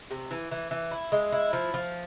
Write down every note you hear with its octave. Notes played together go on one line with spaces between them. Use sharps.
C3
E3
E3
E3
E4
G#3
E4
F3
F3